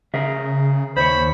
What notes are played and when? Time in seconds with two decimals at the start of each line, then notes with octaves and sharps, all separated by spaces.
0.14 C#3 G#4 A#4 E5
0.97 D#2 C5 C#5 B5